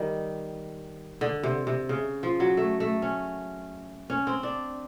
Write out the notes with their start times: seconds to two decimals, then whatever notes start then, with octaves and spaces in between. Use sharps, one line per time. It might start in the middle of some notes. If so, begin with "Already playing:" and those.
Already playing: D#3 G3
1.21 D3
1.43 C3
1.67 C3
1.89 C#3
2.23 F3
2.40 F#3
2.57 A3
2.80 A3
3.02 C#4
4.10 C#4
4.27 C4
4.43 D4